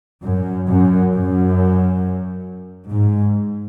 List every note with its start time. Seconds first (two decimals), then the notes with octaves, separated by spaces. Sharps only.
0.24 F#2
0.68 F#2
1.13 F#2
2.90 G#2